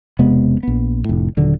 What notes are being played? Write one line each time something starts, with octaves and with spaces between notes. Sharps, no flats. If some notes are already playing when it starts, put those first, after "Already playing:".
E1 C3 G#3 B3
A#1 B3
F1 A2
D#1 D3 F#3